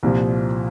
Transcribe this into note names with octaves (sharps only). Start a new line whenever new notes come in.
C2 A#2 F3